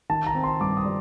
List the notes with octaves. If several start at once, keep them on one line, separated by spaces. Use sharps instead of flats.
D#3 A5
A#5
C4
C6
G2 D6
D#6
G3